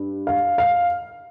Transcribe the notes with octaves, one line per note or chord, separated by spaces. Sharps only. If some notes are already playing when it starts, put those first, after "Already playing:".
Already playing: G2
F5
F5